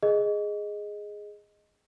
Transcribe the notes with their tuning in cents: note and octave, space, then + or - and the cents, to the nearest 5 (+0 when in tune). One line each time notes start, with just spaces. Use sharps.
G#4 +0 D#5 +0